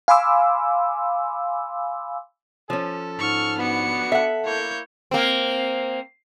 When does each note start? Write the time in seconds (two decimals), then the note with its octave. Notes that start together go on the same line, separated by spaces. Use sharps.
0.08 F5 G#5 B5 C6 D6 E6
2.70 F3 C#4 A4
3.19 G#2 C#6 F6
3.59 B3 D4 F#4 B4 C#7
4.12 A4 E5 F#5
4.45 A#3 E4 C#5 G6
5.11 A#3 C4